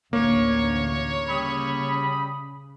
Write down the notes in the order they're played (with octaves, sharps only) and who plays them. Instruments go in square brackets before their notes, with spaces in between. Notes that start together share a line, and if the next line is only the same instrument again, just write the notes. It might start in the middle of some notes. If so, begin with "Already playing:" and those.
[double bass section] A1 D2 [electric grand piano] A#3 [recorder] C#5
[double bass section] C#3 [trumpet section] G3 B5 D#6